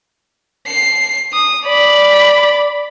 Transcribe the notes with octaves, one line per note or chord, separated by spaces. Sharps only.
C7
D#6
D5 B5